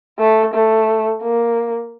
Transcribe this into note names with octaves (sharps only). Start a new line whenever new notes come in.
A3
A3
A#3